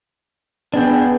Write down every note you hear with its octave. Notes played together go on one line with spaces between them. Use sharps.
B3 D4 G#4 G5